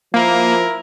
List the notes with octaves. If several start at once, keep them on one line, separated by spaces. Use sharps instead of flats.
F3 A#3 E4 A#4